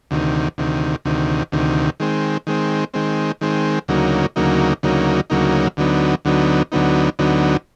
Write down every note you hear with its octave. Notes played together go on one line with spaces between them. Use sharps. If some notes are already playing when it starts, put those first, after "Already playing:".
D2 C3 D#3
D2 C3 D#3
D2 C3 D#3
D2 C3 D#3
D#3 G#3 C4
D#3 G#3 C4
D#3 G#3 C4
D#3 G#3 C4
D2 C#3 F#3 A#3 D#4
D2 C#3 F#3 A#3 D#4
D2 C#3 F#3 A#3 D#4
D2 C#3 F#3 A#3 D#4
D2 D3 F#3 B3 D#4
D2 D3 F#3 B3 D#4
D2 D3 F#3 B3 D#4
D2 D3 F#3 B3 D#4